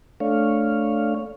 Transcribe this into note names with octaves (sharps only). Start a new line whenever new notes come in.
A3 D4 C#5 F5